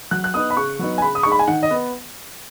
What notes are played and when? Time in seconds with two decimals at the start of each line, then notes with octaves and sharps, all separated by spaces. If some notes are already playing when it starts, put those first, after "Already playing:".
0.11 F#3 F#6
0.24 F#6
0.34 B3 D#4 D#6
0.50 B5
0.57 C#3 C#6
0.79 F#3 B3 D#4
0.98 G#5
1.02 C#3 B5
1.15 D#6
1.23 G#3 D#4 C#6
1.32 B5
1.39 G#5
1.48 D#3 F#5
1.63 D#5
1.71 B3